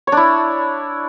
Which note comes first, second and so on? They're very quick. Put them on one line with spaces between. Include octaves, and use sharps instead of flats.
C#5 D4 E4